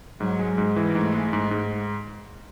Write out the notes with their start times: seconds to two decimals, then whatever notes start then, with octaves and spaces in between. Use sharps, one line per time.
0.20 G#2 F#3
0.39 G#3
0.58 G#2
0.76 E3
0.95 G#2 A3
1.14 G#3
1.33 G#2
1.51 G#2